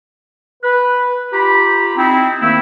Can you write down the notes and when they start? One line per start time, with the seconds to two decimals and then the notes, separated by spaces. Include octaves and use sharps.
0.64 B4
1.33 F4 G4 A#5 B5
1.97 C4 D#4 E4
2.41 D#3 A3 A#3 C4 E4